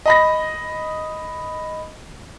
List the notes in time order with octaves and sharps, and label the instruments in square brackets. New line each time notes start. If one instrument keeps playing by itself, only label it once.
[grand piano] D#5 B5 A#6